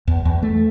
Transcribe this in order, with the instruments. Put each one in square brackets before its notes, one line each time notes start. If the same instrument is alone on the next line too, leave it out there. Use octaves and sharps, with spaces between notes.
[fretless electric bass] E2
E2
A3